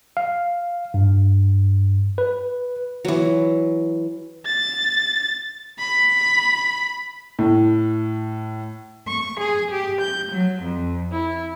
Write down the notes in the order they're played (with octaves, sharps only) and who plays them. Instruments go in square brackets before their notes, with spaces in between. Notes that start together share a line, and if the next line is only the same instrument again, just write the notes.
[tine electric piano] F5
G2
B4
[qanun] E3 F#3
[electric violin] A6
B5
[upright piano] A2
[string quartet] C#6
G#4
G4
G6
F#3
F2
E4